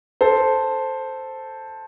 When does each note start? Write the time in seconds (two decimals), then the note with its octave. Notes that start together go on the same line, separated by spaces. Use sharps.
0.21 A4 C5